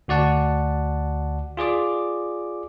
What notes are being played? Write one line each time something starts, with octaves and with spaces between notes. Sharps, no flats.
D2 F#4 D5 F#5 A5
F4 G#4 D5 D6